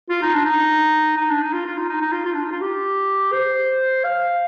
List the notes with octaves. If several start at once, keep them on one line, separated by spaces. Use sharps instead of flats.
F4
D#4
D4
D#4
D#4
D4
D#4
F4
F4
D#4
D#4
D#4
F4
F4
D4
D#4
F4
G4
C5
F5